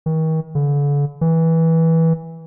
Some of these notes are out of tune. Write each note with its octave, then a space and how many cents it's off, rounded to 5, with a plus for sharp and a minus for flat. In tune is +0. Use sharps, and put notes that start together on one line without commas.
D#3 +40
D3 -40
E3 -15